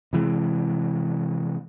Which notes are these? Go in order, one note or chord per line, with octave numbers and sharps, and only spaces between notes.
C3 E3 G#3